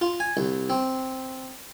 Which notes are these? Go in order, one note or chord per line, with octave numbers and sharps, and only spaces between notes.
F4
G#5
C2
C4